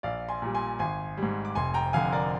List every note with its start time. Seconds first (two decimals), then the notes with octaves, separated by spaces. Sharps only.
0.03 A#1 D5 F5
0.29 G#5 C6
0.42 A#2 G3
0.55 G#5 C6
0.79 G#1 G#5 C6
1.17 G#2 G3
1.45 D6
1.55 F1 G#5 C6
1.74 G5 A#5
1.93 F2 D3 F5 G#5
2.12 A#4 D5